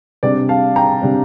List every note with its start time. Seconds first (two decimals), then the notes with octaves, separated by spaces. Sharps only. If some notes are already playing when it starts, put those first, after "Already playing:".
0.23 C3 G3 D4 D5
0.49 F5 A5
0.76 G5 A#5
1.02 C3 G3 D4